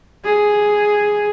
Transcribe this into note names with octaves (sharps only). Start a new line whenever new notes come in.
G#4